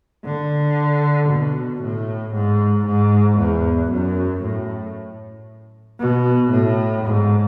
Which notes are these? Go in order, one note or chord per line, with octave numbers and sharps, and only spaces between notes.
D3
B2
A2
G#2
G#2
E2
F#2
A2
B2
A2
G#2